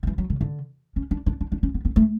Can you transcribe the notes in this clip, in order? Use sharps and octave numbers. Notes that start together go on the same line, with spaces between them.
D3
E3
F#3
D3
D3
C#4
D4
D4
D4
D4
C#4
B3
B3
A3